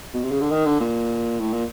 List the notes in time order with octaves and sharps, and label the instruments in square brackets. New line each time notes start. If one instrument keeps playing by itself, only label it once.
[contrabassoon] B2
C3
C#3
D3
D#3
D3
A#2
A2
A#2